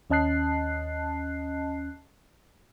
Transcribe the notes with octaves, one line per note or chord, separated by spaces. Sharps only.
D#2 C#4 D#5 A5 F#6 C7